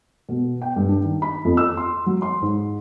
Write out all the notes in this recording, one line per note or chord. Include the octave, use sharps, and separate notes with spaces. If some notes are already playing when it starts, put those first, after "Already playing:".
B2
G5
G2
D4
D#3
B5
F2
E6
C6
F#3
C6
G#2